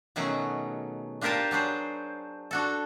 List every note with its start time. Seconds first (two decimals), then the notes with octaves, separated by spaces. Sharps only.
0.16 B2 D#3 F#3 A3 C#4 G#4
1.21 D4 F4 G4 A#4 C5 A5
1.51 F#3 D4 G#4 C5
2.51 D4 F#4 A4